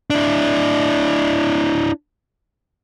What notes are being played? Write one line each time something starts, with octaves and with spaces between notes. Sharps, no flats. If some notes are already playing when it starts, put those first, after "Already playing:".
D4 E4